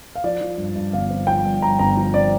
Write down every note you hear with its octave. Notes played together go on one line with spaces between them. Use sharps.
F5
F3 D5
F3
G2
G2
G1 F5
C4
F3 G5
G2
G2 A#5
G1 A#5
F3
C4 D5